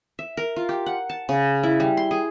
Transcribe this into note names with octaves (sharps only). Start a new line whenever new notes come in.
E5
A#4
F4
G4
F#5
A5
C#3
E4
G3
C6
G#4